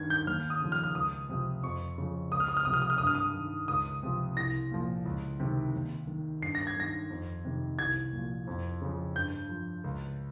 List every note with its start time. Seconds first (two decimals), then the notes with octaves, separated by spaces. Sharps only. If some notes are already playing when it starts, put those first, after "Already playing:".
Already playing: G2 D#3 G#6
0.10 G6
0.27 D#2 F6
0.50 D#6
0.61 C#3 F3
0.72 F6
0.84 F6
0.95 C#2 D#6
1.29 C3 F3
1.63 F2 C#6
1.98 C#3 F3
2.31 C#2 D#6
2.40 F6
2.48 D#6
2.57 F6
2.65 C3 F3 D#6
2.73 F6
2.82 D#6
2.90 F6
2.98 G2 D#6
3.07 F6
3.15 D#6
3.34 D#3
3.68 C#2 D#6
4.03 C3 F3
4.37 C2 A#6
4.72 A#2 F3
5.05 C#2
5.40 C3 D#3
5.74 D#2
6.07 D#3
6.42 G2 C7
6.55 A#6
6.67 G#6
6.77 D#3 A#6
7.10 F2
7.45 C3 D#3
7.78 C2 G#6
8.13 A#2 F3
8.47 F2
8.82 C#3 F3
9.15 G2 G6
9.49 F3
9.84 C#2